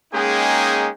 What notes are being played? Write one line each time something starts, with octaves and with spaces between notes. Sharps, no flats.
G#3 A#3 C#4 D#4 G#4 G5